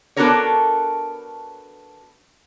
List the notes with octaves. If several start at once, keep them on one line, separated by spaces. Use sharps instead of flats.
B3 D4 F#4 A4 A#4 C#5